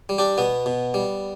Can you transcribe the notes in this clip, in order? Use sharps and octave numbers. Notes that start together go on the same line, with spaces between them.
G3
D4 G4
B2 B3
B2
G3